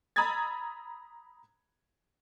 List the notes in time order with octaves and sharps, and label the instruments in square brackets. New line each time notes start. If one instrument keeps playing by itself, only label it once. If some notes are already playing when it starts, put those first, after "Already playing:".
[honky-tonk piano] A#5 B5 D#6 E6 G#6 A6